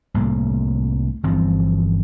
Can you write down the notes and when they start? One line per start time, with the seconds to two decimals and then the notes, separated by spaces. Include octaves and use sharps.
0.14 C2 A2 A#3
1.23 G1 E3 F3 C4